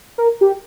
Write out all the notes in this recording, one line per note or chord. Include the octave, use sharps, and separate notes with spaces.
A#4
G4